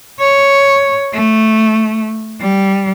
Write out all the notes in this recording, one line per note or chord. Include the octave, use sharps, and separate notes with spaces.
C#5
A3
G3